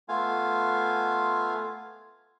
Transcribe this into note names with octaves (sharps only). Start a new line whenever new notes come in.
A3 B3 F4 F5 G#5